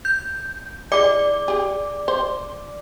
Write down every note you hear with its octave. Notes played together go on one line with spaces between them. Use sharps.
G6
G#3 E4 D5 D6
G4 G#4
C5